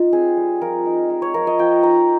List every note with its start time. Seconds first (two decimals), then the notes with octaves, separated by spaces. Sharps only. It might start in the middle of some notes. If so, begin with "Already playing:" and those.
Already playing: D#4 F4
0.12 C4 G#4
0.37 G3
0.61 F3 A#4
0.86 D#4
1.10 G#3
1.22 C#5
1.34 F3 A#4
1.47 D#5
1.59 F3 G5
1.83 D#4 A#5